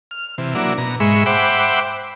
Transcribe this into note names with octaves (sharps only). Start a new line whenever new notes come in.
F6
C3 E3
F#3 A#3 D4 E4
B2 A#5
G#2 G#3 E5 B5 C#6
C5 E5 F#5 G5 B5 D6